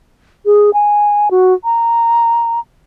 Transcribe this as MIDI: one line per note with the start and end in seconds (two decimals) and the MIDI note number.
0.46 0.70 68
0.74 1.29 80
1.31 1.54 66
1.64 2.60 82